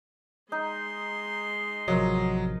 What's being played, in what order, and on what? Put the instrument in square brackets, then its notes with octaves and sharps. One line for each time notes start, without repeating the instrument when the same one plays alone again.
[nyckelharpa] G#3 C6 [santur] D#4
[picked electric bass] A1 C3 F3 [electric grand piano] F#3 [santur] F4 A#4 D#5